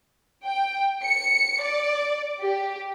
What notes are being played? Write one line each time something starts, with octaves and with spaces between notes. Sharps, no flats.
G5
C#7
D5
G4